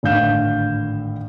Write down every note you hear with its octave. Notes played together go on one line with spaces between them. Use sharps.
G#1 A2 D3 F5 G6 E7